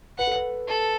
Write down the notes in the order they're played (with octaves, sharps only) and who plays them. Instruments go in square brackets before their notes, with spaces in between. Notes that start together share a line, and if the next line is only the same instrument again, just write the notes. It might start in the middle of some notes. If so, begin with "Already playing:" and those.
[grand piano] B4 [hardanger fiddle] F#5
[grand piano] A4
B4
[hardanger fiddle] A4